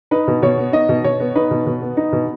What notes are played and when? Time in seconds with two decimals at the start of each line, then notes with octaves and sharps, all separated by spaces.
0.11 D#4 B4
0.27 B2
0.42 B2 C#5
0.58 B3
0.73 D#4 D#5
0.89 B2
1.04 B2 C#5
1.20 B3
1.35 D#4 B4
1.51 B2
1.66 B2
1.81 B3
1.97 D#4
2.12 B2